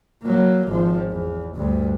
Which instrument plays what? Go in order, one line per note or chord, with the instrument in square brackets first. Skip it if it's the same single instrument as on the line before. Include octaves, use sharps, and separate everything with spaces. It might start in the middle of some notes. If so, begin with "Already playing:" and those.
[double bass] F#3 A#3
G#1 F3
E2
D2 G2